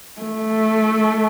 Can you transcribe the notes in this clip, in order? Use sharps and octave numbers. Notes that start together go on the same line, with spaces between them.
A3